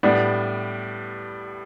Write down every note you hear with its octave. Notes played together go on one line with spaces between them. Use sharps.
A2 G3 B3 D4